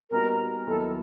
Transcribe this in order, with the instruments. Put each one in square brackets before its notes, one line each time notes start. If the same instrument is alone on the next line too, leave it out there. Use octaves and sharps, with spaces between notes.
[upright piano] A#2 G3 B3 D#4 F#4 [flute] A#4
[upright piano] D#2 D#3 F#3 B3 E4 [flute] A4